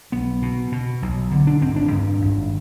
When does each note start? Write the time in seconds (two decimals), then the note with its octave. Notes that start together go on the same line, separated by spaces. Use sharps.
0.12 B1 B3
0.42 B2
0.72 B2
1.02 B1
1.31 D3
1.47 D4
1.61 G#1 C4
1.76 D4
1.91 G2
2.21 G#1